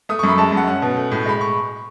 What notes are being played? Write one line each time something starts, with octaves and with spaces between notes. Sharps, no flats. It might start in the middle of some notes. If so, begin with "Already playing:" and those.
A3 D#6
F#2 C#6
B5
G#3 A5
F#2 F#5
C#4 F#5
B2
A3
A2
G#3 B5
C#6